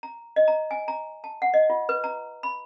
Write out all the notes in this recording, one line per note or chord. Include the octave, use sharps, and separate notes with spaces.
A#5
D#5
A#5
G#5
A#5
A5
F#5
D#5
F4
B4
A#5
B5